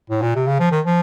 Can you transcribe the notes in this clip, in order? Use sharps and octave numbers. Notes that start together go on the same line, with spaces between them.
A2
A#2
C3
C#3
F3
D#3
F3